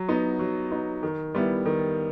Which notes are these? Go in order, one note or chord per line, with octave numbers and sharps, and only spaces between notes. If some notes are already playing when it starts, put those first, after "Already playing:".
Already playing: F#3
B3 D#4
F#3
B3 D#4
D#3
G3 B3 E4
D#3